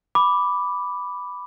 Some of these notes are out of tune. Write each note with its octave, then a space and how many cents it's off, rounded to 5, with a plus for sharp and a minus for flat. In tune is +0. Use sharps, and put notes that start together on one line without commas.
B5 +0 D6 +0